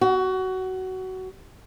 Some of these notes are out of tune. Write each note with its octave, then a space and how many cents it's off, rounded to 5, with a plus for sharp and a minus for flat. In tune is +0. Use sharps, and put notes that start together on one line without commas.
F#4 +20